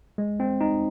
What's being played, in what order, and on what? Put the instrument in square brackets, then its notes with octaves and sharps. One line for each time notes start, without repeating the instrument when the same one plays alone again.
[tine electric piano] G#3
C4
D#4